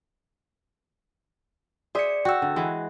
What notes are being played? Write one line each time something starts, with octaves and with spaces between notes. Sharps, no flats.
G#4 C5 D5 E5 C#7
F#4 G5 E6
D3
E3 G#3